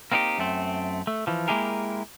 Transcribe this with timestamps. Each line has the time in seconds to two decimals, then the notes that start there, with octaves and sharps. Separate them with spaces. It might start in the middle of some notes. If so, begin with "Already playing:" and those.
0.12 A#3 C4 D#4 F#4 G4
0.38 F#2 A3 C4
1.07 A3
1.27 E3 F3
1.48 G#3 A#3 E4 G4 G#4 A#4